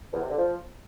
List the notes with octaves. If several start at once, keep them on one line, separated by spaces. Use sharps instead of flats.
E2
C3
D3
F3